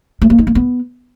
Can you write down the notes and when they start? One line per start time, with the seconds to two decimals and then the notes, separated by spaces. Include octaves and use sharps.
0.22 A3
0.30 A#3
0.38 D#4
0.47 A#3
0.55 B3